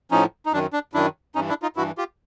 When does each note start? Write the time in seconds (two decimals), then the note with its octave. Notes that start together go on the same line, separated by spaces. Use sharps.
0.11 A2 F3 C#4 D#4
0.46 D#4
0.52 F#2 D#3 D4
0.73 D4
0.94 F#2 D#3 D4 E4
1.35 G2 E3 C#4 D#4
1.49 D4 E4
1.62 D#4 F4
1.76 G2 E3 E4 F#4
1.98 F4 G4